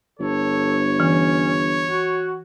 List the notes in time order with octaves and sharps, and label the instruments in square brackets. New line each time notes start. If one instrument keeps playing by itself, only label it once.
[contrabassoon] G1 [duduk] A4 [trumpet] C#5
[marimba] E3 [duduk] C#4
[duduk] F#4